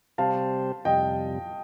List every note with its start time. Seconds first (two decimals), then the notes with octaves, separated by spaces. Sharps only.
0.18 C3 G3 C4 G4 C5 F5 A5
0.85 F2 C3 G3 D#5 G5